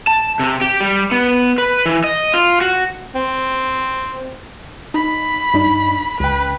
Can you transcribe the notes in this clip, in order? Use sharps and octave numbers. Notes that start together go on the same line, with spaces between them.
A5
C3
G4
G3
B3
B4
E3
D#5
F4
F#4
C4
D#4 B5
G2 D4 D#4
C#2 B4 G5